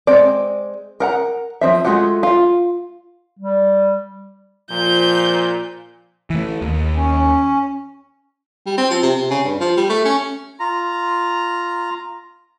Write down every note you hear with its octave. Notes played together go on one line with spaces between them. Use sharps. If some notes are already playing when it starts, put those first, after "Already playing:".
G#3 C4 D5
A#4 F#5 A#5
F3 F#3 C4 E5
G#3 A3 F4 F#4 F#5
F4
G3
A#2 F3 G6
E3 A3
D#2
C#4
G3
C4
F3
C3
C3
C#3
G2
F3
G3
A3
C#4
F4 A#5